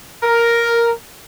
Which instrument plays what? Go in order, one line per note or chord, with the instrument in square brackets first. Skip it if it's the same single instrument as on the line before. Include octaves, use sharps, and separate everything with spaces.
[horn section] A#4